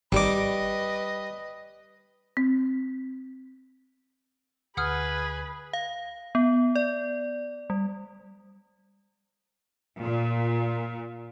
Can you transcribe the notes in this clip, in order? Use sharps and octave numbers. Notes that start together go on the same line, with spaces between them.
G#1 G3 B4 D#5 D6
C4
D2 G#4 B4 F#5 D#6 F6
F5
B3
D5
G3
A#2